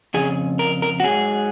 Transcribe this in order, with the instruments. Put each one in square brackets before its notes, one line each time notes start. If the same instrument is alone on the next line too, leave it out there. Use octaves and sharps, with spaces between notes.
[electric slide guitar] F2 C#3 G#4
A#4
A#4
F#4
G#2 F#3 G#4